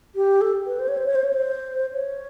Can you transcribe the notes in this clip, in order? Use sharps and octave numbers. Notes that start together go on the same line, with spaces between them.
G4
A4
B4
C5
C#5
C5
C#5
C5
C#5
C5
C#5